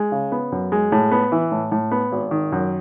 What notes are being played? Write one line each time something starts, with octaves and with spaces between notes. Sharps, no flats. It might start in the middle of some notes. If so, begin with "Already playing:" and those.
Already playing: G#3
C#3
B3
F#2
G#3
A2
B3
E3
A2
A2
B3
G#1
D#3
F#2